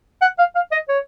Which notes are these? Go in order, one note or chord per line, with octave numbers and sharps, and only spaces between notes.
F#5
F5
F5
D#5
C#5